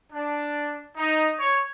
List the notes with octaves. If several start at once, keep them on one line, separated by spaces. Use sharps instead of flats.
D4
D#4
C#5